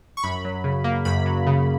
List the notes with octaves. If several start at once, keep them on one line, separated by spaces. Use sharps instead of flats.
C#6
F#2 B5
F#3
C#3
A#3
F#2 B5
F#3
C#3